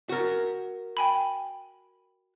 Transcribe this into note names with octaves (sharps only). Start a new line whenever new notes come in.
F#4 A#4
G5 G#5 B5